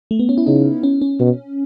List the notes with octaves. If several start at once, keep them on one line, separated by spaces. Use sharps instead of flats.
A3
B3
C#4
E4
C#3 D#4
C#4
C#4
B2